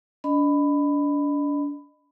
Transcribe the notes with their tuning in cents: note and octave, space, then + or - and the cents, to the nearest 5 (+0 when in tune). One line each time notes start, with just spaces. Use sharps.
D4 -30 D#5 -25 B5 +15